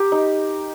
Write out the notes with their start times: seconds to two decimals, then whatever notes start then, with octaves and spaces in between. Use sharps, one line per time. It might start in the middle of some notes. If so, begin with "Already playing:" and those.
Already playing: G4 A#4
0.12 D#4